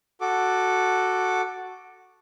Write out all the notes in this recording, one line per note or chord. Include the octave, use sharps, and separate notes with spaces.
F#4 A4 D6